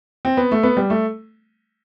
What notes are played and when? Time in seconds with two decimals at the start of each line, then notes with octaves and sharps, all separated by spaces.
0.25 C4
0.37 B3
0.52 A3
0.63 B3
0.77 G3
0.90 A3